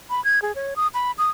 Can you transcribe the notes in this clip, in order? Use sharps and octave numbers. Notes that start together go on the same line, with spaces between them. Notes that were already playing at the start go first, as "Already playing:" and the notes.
B5
G#6
G#4
C#5
D#6
B5
D#6